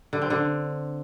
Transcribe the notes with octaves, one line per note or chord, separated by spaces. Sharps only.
D3
C4
D3